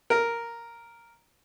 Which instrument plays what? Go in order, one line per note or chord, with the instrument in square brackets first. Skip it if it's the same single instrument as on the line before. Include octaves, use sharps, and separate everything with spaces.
[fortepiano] A#4